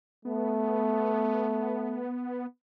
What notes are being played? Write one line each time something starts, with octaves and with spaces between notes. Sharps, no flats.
A3 B3